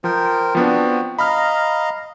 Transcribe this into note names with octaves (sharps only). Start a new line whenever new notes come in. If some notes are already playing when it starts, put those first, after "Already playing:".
F3 A#4 C5 G5
F3 B3 C4 D4 F#4
D#5 F5 A#5 B5 F6